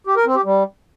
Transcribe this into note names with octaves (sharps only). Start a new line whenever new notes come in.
G4
A#4
C4
G4
G3